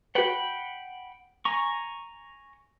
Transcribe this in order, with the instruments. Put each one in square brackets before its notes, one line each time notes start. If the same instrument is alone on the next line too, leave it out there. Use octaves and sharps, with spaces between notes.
[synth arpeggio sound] F#4 B4 [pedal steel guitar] F#5 G5 B5
[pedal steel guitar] G#5 A#5 C#6